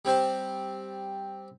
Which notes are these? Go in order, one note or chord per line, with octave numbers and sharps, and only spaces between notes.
G3 C4 C5 A5